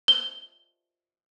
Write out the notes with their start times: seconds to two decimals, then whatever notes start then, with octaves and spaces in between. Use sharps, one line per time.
0.08 G7